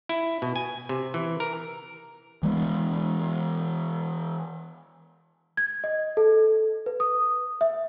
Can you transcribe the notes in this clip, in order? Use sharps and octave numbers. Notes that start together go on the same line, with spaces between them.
E4
B2
G#5
C3
E3
A#4
E3 G#3 A3 B3
G#6
D#5
A4
B4
D#6
E5